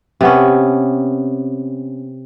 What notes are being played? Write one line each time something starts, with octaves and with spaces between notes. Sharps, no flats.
C3 B3 C#4